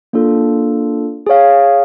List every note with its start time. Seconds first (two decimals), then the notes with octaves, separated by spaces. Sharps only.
0.13 A#3 D4 F4 A4
1.27 G#4 C#5 F5